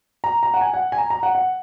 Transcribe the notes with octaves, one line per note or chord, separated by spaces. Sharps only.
A#5
A#5
F#5
G#5
F#5
G#5
A#5
A#5
F#5
F#5